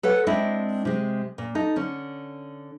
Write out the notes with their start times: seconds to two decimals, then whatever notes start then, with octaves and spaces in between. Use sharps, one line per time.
0.03 A4 B4 C#5 F#5
0.27 G#3 C4 D4 E4
0.85 C3 G#3
1.38 A#2
1.55 D#4 A4
1.76 D3 C#4